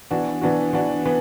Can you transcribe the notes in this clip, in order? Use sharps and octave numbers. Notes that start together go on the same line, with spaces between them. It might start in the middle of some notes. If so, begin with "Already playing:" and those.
E3 B3 D4 F#4
E3 B3 D4 F#4
E3 B3 D4 F#4
E3 B3